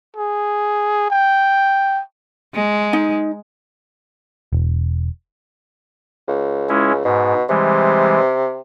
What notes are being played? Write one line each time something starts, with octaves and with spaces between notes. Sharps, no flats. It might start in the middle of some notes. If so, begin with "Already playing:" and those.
G#4
G5
G#3
D#4
E1
C#2
G#3 C#4 E4
G#2 B2
C3 E3 G3 G#3